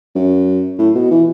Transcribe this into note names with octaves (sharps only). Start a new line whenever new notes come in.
F#2
A2
B2
E3